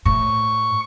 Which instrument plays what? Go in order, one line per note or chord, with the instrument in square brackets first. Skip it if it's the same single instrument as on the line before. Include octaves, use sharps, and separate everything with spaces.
[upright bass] A2 [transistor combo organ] C#6